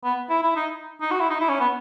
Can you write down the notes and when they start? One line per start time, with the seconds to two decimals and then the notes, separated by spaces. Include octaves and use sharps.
0.04 B3
0.30 E4
0.43 E4
0.56 D#4
1.01 D#4
1.11 F#4
1.20 E4
1.30 D#4
1.40 E4
1.49 C#4
1.60 B3